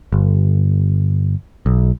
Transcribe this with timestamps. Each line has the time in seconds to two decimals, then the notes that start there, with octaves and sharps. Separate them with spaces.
0.13 G1
1.66 B1